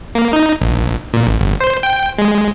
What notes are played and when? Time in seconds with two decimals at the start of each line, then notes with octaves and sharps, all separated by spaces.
0.15 A#3
0.33 D#4
0.61 A#1
1.14 A#2
1.27 A1
1.40 G1
1.61 C5
1.83 G5
2.18 G#3